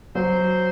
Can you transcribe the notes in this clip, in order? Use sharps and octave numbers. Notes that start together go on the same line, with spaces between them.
F#3 C5